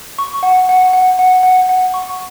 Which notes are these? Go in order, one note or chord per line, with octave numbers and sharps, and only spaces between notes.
C#6
F#5
F#5
F#5
F#5
F#5
F#5
C#6